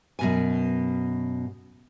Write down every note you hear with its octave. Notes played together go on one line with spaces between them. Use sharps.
F#2 B2 G#5